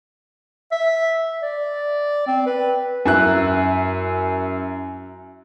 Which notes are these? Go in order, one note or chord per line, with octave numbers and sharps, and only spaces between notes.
E5
D5
C4
B4
F#2 E4 F#6